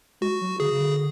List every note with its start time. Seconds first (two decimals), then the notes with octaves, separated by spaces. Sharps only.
0.21 G#3 F#4
0.41 F#3
0.60 D3 G#4
0.71 C#3
0.80 D3